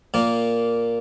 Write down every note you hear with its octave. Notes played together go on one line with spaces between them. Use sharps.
A#2 A#3